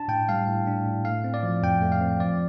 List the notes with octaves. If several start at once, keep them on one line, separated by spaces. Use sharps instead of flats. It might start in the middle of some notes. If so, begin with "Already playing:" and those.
Already playing: D4 A5
A2 G5
G3 F5
A2
D4
A2
A3 F5
C4
D5
F3
F2 G5
A3
F5
C4
F3 D5